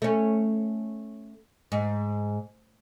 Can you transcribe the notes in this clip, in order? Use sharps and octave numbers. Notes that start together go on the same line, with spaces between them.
A3 C#4
G#2